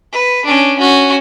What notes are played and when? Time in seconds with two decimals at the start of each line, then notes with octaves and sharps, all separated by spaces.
0.12 B4
0.45 C#4 D4
0.78 C#4 F#4